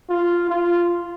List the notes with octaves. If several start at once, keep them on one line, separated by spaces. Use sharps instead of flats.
F4
F4